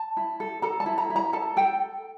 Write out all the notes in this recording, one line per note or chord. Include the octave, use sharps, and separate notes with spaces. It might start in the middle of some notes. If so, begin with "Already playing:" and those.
Already playing: A5
E4
A4
A4 A#5
A5
E4
A#5
E4
A#5
A4 A5
A4 G5